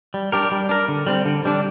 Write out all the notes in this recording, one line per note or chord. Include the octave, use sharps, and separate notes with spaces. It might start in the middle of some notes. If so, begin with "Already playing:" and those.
G3
D4 G4 A#4
G3
D4 A#4
D3
G3 C4
D3
G3 D4